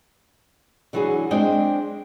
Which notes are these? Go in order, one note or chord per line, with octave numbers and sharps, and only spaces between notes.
D3 E3 F#3 B3 G#4
G#3 C4 D4 C5 G5